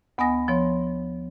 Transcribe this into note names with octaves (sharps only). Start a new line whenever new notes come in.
D2 B3 D#5 G#5 D#6 A#6
F3 B3 C#5 C6